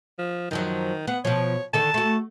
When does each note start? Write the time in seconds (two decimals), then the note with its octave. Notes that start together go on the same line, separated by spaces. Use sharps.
0.19 F3
0.51 F#2 D#3 F3 F#3
1.07 B3 F#5
1.25 B2 F3 C#5
1.73 D3 D#3 A4 A5
1.94 A3 F#4